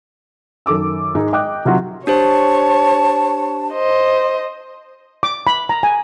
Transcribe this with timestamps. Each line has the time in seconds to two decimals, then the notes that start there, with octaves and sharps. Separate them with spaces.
0.66 F#2 D#3 A4 D6 E6
1.15 G#2 G#3 D#4
1.33 D#5 G5 D6 F#6
1.65 C3 D#3 F#3 F4 F#4
2.07 D4 G4 C5 C#5 A5
3.72 C5 D#5
5.23 D6
5.47 B5
5.69 A#5
5.83 G#5